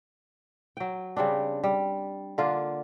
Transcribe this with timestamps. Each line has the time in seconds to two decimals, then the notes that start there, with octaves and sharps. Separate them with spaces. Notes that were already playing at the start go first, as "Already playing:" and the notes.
0.77 F#3 G5
1.17 C#3 G3 C4 D4
1.64 G3
2.38 D3 A#3 D4 F4